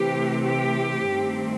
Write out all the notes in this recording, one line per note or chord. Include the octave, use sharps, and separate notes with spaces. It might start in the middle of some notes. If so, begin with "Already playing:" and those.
Already playing: C3 E3 A3 C4 G4
G4
G2 D#3 A3 C4